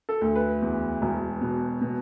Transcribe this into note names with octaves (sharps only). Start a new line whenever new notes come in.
A4
D2
B4
E2
E1
B2
B2